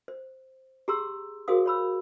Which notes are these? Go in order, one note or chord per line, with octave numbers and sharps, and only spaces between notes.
C5
G4 G#4 A#5 C6 E6
F#4 G#4 A#4 C5 F5 D#6
C#5 B5 E6